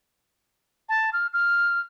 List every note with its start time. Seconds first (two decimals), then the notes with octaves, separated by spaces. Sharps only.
0.89 A5
1.13 F6
1.33 F6